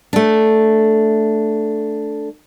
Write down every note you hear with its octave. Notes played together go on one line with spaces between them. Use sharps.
A3 D4